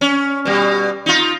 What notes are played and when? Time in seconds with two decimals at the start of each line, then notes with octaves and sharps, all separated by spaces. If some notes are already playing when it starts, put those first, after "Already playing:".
0.01 C#4
0.45 B2 G3
1.06 D#4 F4